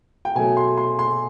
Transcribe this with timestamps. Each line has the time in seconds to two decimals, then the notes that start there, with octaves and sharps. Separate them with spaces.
0.25 G5
0.35 B2 F#3 A3 G#5
0.57 C6
0.77 C6
0.99 C6